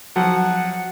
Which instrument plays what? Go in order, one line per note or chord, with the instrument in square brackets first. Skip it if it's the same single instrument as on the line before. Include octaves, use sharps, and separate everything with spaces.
[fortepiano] F3 F#3 [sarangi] F#5